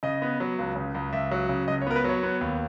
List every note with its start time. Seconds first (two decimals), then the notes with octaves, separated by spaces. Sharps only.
0.03 C#3 D#5
0.22 B3
0.40 F#3
0.59 C#2
0.76 C#3
0.94 C#2
1.13 C#2 E5
1.31 F#3
1.49 C#3
1.68 C#2 D#5
1.81 C#5
1.87 B3 A#4
1.96 B4
2.04 F#3 C#5
2.23 B3
2.41 D#2